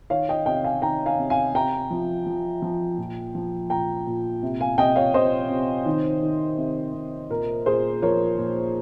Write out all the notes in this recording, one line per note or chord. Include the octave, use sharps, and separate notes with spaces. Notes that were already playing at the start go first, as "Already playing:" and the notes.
D#3 C#5 F5
D#5 G5
C3 D#5 G5
F5 G#5
D#3 G5 A#5
F5 G#5
C3
F5 G#5
C3 G5 A#5
F3
F3
F3
A#2
F3
A#2 G5 A#5
A#2
C3
F5 G#5
C3 D#5 G5
C#5 F5
C3 C5 D#5
C3
D#3
D#3
C3
C3
A#2 A#4
A#2 G#4 C5
F3 A#4 C#5
A#2